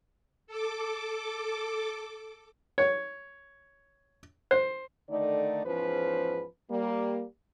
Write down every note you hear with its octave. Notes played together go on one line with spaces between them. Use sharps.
A4 D6
C#5
C5
D3 D#3 A3 D#4 D5
E2 G#2 F3 C#4 B4 C5
G3 A#3